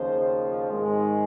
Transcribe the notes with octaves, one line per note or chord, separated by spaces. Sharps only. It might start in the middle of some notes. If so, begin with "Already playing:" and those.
Already playing: D#2 C#3 F3 C5
G#1 G#2 D#3 G#3